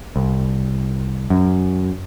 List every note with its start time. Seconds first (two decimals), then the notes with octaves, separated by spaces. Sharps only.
0.16 C2
1.30 F#2